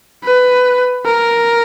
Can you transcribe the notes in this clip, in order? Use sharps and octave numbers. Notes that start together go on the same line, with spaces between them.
B4
A#4